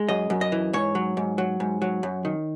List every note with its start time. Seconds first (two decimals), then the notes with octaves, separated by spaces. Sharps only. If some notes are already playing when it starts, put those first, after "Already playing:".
Already playing: G#3
0.08 F#2 D#5
0.30 F#2
0.41 D#5
0.52 E3
0.73 G#2 C#5
0.95 F#3
1.17 G#2
1.38 F#3
1.60 G#2
1.82 F#3
2.03 F#2
2.25 D#3